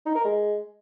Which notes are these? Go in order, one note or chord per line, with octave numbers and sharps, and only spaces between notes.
D#4
A#4
G#3